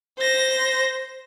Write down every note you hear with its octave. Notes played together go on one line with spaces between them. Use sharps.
C5 A#6